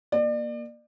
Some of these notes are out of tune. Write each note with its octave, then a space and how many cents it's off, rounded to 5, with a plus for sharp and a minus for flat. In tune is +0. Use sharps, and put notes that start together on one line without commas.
A#3 +15 D5 +35